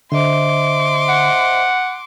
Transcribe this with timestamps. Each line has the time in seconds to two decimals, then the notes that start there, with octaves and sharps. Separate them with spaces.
0.12 D3 C5 D#5 E5 C6 D6
1.09 F#5